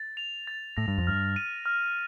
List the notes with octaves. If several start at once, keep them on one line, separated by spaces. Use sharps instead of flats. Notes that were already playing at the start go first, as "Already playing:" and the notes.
Already playing: A6
F7
A6
A2 A#6
G2
F2
G2 F6
D#7
F6